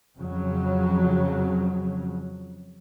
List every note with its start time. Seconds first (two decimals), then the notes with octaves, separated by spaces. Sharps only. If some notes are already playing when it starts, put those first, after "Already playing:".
0.18 F2 C#3 F3 F#3